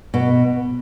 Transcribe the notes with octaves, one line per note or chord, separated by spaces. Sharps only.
B2